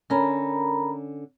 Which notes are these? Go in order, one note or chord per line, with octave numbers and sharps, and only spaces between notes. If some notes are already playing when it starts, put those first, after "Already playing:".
D3 C#4 A#4 A#5 B5